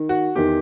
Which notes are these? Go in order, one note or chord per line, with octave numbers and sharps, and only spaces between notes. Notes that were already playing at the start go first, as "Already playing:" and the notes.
Already playing: D#3
F#4
E2 D#3 G4